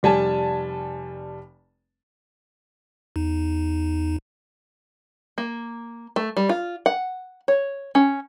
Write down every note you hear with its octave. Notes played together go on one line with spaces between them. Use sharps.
F1 G3 G#5 A5
E2 D#4
A#3
A3
G3
F4
F#5
C#5
C#4